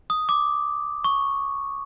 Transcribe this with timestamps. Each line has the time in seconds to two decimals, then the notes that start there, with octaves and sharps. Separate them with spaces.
0.10 D#6
0.29 D6
1.04 C#6